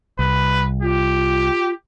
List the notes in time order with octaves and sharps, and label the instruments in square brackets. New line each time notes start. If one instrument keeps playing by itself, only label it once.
[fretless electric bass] C2 [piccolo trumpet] B4
[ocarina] F4 [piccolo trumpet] G4